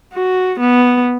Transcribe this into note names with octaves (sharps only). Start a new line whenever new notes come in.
F#4
B3